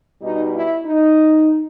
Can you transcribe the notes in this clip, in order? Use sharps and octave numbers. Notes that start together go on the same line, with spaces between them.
B2 G3 D#4
E4
D#4